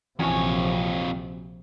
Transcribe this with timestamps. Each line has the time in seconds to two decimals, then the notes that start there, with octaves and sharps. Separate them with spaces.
0.19 A#1 F2 C3 E3 C#4 F#4 C#5 G#5